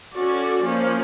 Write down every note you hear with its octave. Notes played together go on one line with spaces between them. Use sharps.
C#4 F#4 A4 D5
F3 A#3 C#4